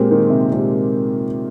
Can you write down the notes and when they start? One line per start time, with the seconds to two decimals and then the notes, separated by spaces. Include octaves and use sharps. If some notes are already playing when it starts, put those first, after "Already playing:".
Already playing: A#2 G#3 A#3 C4 G4
0.11 D#3
0.30 C3
0.50 A#2 G#3 C4 G4